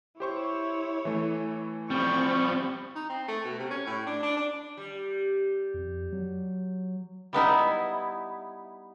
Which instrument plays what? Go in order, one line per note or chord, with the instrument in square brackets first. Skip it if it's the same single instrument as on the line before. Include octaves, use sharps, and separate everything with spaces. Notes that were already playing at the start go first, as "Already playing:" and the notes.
[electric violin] E4 C#5 [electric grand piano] G4 C5 C#6
[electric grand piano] E3 A3
[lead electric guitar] F3 G3 [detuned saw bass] C4 [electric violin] B5 C#6
[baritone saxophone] D#4
C4
A3
B2
C3
C#4
A2
D4
D4
D4
[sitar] G3
[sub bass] F2
F#3
[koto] G3 B3 D#4 E4